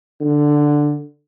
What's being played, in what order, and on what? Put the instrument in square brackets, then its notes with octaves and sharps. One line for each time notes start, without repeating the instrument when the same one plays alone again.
[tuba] D3